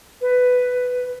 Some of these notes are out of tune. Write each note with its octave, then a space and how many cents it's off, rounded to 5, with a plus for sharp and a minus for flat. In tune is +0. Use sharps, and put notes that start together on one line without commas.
B4 +10